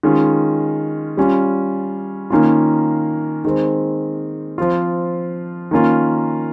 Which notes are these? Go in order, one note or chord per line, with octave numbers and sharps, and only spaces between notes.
D#3 G#3 C#4 F4
G3 C#4 F4
D#3 A#3 C#4 F4
D#3 G#3 C4
F3 C4 F4
D#3 A#3 C#4 F4